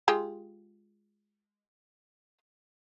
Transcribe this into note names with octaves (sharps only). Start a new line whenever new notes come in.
G#3 F4 G4